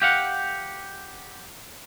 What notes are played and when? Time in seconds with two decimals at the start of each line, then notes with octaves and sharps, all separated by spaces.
0.02 G4 F5 F#5